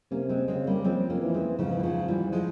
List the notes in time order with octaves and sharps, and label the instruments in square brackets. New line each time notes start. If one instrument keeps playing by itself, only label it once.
[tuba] C3 [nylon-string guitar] A#3 C#4
[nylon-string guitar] G#3 C4
[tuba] C#3 [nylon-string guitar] G#3 C4
[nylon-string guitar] G3 A#3
[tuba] F3 [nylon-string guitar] G#3 C4
[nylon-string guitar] A#3 C#4
[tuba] E3
[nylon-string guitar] G#3 C4
[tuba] G#2 [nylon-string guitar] C#3 F3
[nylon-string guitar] E3
C#3 F3
E3 G3
F3 G#3